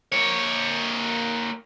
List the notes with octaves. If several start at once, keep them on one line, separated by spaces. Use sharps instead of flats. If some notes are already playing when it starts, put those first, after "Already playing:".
A#3 C#5